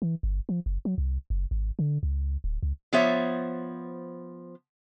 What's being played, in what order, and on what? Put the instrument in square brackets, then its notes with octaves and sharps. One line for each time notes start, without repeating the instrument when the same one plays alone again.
[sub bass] E3
G1
F3
F#1
F#3
C2
F#1
G#1
D3
C#2
D1
C#2
[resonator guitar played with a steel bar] F3 B3 C5 C#5 E5